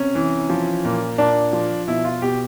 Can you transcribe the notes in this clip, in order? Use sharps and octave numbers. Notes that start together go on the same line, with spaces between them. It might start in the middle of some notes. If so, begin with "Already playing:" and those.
Already playing: C3 C#4
E3
F3
A#2
A#2 D4
F3
B2 E4
F4
B2 G4